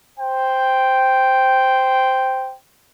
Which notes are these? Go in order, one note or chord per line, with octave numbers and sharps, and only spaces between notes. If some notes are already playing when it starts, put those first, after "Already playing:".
C5 G5